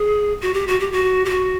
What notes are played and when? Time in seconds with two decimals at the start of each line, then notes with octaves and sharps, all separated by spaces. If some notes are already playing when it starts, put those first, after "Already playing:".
Already playing: G#4
0.42 F#4
0.54 G4
0.68 F#4
0.80 G4
0.92 F#4
1.25 G4
1.29 F#4